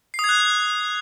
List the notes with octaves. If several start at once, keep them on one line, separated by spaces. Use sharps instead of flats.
C7
D#6
G#6
F#6